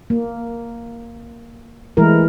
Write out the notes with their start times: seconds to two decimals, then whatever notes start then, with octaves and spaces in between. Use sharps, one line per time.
0.10 A#3
1.97 E3 G#3 A3 E4 A#4